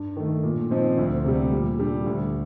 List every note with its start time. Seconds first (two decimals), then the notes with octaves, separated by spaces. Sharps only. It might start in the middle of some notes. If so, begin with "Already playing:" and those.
Already playing: G2
0.16 D#3 A3
0.43 A#2
0.71 F3 C4 D#4
0.98 D2
1.24 C3 G3
1.52 A#2
1.79 G3 D4
2.06 D2